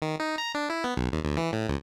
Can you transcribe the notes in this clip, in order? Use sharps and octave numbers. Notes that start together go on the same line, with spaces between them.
D#3
D#4
A#5
D4
E4
B3
B1
D#2
D2
E3
A2
C#2